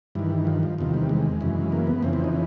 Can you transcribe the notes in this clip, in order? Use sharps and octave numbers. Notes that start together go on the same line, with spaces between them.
G2 D#3 E3
F3
F3
E2 C3 D#3 F3
G3
G#3
F#2 C#3 E3
A#3
B3
F2 C#3 E3 C4
C4
D#4